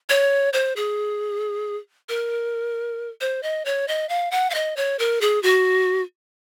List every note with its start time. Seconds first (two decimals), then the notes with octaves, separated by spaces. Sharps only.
0.09 C#5
0.53 C5
0.76 G#4
2.09 A#4
3.21 C5
3.43 D#5
3.65 C#5
3.88 D#5
4.09 F5
4.31 F#5
4.50 F5
4.54 D#5
4.77 C#5
4.99 A#4
5.21 G#4
5.43 F#4